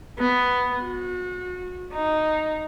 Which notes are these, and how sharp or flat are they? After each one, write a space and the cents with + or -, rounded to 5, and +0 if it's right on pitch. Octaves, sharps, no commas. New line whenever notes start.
B3 +5
F#4 -35
D#4 -5